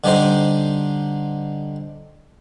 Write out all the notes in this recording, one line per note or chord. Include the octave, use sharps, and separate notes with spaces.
D3 G3 D4 D#4 C5